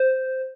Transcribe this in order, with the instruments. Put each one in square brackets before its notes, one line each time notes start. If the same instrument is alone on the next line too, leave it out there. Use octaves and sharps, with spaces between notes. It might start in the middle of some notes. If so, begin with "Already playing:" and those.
Already playing: [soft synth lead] C5